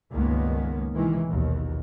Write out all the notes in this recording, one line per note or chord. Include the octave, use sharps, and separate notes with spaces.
C#2 G2 D#3 G#3 A#3 B3
A2 C3 D#3 E3 G#3
A#1 D#2 B2